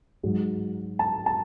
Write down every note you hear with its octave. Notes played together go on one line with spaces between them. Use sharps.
G#2 F#3
A5
A5